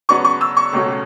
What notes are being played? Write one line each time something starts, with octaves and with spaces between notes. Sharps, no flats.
C#3 F#3 B3 D4 C#6
C#6
E6
C#6
C#2 B2 F#3 A3 C#4